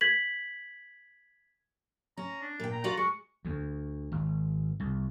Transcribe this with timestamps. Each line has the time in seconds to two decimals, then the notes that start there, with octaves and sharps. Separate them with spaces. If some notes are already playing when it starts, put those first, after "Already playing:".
0.01 G#6 B6 F#7
2.17 C#4 A#5
2.41 D4
2.60 A#2 G5
2.72 A#5
2.84 F4 F#4 D5
2.97 G#3 C#6
3.45 D2
4.12 G#1
4.80 C2